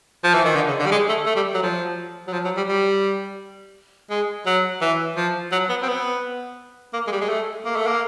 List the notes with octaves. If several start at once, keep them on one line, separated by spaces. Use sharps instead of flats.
F3
E3
D#3
D3
C#3
D3
G3
G#3
A3
A3
G3
F#3
F3
F#3
F3
F#3
G3
G3
G#3
F#3
E3
F3
F#3
B3
C4
B3
A#3
G#3
G3
G#3
A3
A#3
A3
A#3